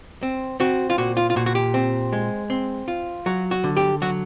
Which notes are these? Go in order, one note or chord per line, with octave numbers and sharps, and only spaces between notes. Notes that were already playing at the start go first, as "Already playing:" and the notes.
C4
C4 F#4
F4
A#2 F#4
F4
F4
A#2 F#4
F#4
G4
C4
G#3
C4
F4
F#3 F#4
F#4
D3
G4
F#3 F#4